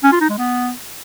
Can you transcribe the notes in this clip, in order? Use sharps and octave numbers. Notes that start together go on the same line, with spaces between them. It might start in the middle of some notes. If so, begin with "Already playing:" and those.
C#4
F4
D#4
G#3
B3